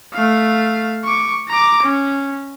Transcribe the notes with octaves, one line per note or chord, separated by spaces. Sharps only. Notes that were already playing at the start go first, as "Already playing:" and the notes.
A3 F5
C#6 D6
A#5 D6
C#4